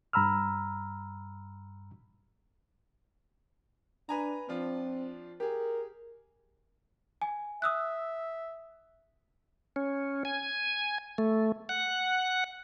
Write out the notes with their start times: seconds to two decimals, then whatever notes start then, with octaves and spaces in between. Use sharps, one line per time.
0.13 G2 A#5 B5 E6 F6
4.09 D4 B4 G#5 A#5
4.49 F3 C4 D4 F4
5.40 G4 G#4 A#4
7.22 G#5
7.62 E5 D#6 E6 F#6
9.76 C#4
10.25 G#5
11.18 A3
11.69 F#5